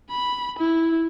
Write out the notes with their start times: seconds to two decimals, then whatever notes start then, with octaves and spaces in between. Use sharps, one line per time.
0.10 B5
0.58 E4